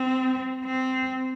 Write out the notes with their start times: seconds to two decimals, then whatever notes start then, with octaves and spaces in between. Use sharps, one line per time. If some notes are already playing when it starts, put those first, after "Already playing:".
Already playing: C4
0.65 C4